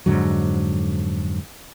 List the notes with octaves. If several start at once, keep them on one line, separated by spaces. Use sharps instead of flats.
F2 G#2 D3 F#3